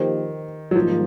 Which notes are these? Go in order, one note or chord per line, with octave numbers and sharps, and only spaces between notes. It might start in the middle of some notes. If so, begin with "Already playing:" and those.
Already playing: D#3 F3 A#3 D#4 G4 C5
F#3
G#2 D#3 F3 G3 A#3 D#4